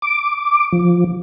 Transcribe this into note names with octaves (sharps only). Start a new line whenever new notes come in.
D6
F3